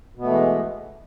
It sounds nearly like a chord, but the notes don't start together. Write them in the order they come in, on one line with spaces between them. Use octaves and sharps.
B2 B3 A3 E3 G#3